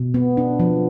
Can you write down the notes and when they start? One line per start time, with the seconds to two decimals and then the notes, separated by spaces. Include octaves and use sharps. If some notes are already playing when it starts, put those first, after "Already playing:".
Already playing: B2
0.14 B3
0.37 D4
0.60 F3